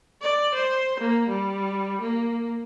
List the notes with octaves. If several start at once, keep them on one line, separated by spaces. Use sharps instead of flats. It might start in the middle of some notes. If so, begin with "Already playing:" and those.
D5
C5
A#3
G3
A#3